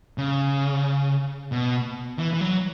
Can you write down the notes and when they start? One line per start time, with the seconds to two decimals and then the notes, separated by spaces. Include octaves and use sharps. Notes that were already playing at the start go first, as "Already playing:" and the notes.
0.18 C#3
1.52 B2
2.19 E3
2.33 E3
2.41 F#3